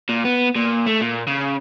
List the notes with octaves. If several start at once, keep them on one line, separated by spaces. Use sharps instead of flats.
A#2
B3
A#2
A3
A#2
C#3